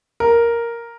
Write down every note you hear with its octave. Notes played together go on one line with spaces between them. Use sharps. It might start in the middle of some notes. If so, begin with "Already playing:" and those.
A#4